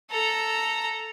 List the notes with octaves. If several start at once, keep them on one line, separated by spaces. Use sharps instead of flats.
A4 A#5